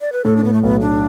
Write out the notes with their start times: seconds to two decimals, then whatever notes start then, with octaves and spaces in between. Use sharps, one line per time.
0.01 D5
0.12 B4
0.25 A2 A4
0.36 D4
0.43 A2 B3
0.53 A3
0.63 B1 B3
0.81 A2 D4